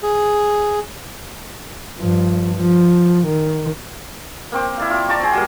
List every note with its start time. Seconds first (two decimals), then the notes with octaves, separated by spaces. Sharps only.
0.03 G#4
2.00 G2 F3
2.56 F3
3.27 D#3
4.52 A#3 C4 D6
4.78 E4 D5 F5
4.90 F4 D6
5.08 D5 A5 A#5 C#6
5.19 C4 G#4
5.33 F#3 G3 A#3